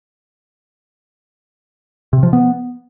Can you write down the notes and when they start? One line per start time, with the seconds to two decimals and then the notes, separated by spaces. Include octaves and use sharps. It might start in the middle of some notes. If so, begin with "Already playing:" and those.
2.13 C3
2.23 F3
2.33 B3